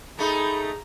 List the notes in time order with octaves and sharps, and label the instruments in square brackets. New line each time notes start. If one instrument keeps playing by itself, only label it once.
[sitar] A3 D#4 [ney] G#4 [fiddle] A#5 [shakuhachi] B5